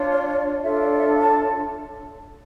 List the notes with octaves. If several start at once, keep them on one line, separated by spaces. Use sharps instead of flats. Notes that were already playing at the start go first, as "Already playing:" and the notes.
Already playing: D4 F4 C#5
D5
D5
C#5
D4 F4 A4 C#5 E5
D5
D5
E5
A5